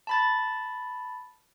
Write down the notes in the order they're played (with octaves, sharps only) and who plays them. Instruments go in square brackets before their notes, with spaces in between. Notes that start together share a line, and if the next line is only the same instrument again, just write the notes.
[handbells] A5 B5 A6